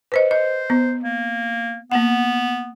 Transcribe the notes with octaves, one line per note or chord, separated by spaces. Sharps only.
B4 C5 D#5
C5 D#5
B3
A#3
A#3 B3 F#5